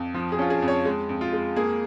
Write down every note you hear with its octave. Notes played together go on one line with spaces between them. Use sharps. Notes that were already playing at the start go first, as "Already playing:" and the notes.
Already playing: F2
F3
G#4
C#4 F4
G#4
F2
C#5
G#3
F2
F4
G#3
A#3 G#4